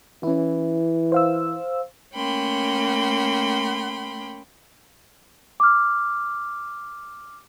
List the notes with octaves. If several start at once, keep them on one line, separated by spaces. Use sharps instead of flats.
E3 C#4 E4
C5 F5 E6
A3 A#3 C#4 G5 B5 C6
D6 F6